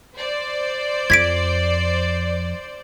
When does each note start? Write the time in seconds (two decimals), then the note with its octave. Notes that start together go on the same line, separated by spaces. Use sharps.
0.16 C5 D5
1.10 F2 G#6 B6 D7